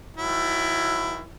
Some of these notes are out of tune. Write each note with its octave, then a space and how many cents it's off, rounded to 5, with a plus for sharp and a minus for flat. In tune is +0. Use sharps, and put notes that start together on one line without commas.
D#3 +40 F#3 +0 E4 +20